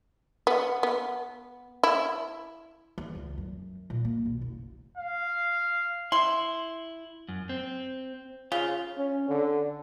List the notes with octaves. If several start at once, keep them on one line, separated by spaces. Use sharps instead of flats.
B3
B3
E4
E2
C#2
F#2
A#2
A#3
B1
F#1
F5
E4 C6
F#2
C4
C#3 F4
C#4
D3